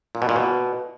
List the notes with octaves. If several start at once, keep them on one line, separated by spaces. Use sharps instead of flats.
A#2
B2
A#2
B2